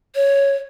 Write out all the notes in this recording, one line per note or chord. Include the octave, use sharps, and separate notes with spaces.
C#5